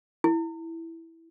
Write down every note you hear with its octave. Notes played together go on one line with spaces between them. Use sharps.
E4